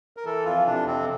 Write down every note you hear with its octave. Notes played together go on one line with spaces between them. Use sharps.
A#4
E3 A4
F2 F4
C3 D4
F2 C4